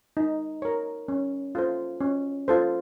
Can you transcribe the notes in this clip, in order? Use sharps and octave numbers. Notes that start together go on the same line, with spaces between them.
D#4
A#4 C#5
C#4
F4 A4 C5
C#4
F4 A4 C5